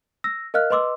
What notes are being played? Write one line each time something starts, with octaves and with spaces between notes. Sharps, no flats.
E6 A#6
A#4 D#5 F5 F6 F#6
B4 D#5 C6 D6 E6